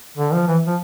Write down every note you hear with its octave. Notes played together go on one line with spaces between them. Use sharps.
D3
F3
E3
F3